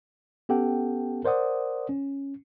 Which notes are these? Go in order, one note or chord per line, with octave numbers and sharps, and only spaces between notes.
B3 C#4 G4 A4 F#5 G5
A#4 C5 D5 F#5 D#6
C#4